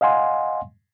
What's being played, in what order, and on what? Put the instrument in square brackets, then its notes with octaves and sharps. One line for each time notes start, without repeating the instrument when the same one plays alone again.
[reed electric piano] D#5 F5 F#5 G#5 C6